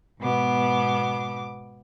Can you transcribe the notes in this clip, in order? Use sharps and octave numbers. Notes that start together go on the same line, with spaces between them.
G#2 B2 B3 D6